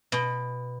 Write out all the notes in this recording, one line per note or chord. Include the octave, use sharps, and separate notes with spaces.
B2